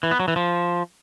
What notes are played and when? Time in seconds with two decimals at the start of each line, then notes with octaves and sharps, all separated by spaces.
0.03 E3
0.11 B3
0.20 F#3
0.28 E3
0.36 F3